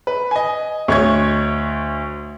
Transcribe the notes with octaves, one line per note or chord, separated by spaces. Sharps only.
B4
D#5 G#5
D2 C#5 D#5 G#6